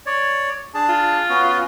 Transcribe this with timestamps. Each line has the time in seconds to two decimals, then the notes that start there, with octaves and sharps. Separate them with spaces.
0.06 C#5 D5
0.74 D4 G#4 A5
0.89 F4
1.29 B3 C#4 F#4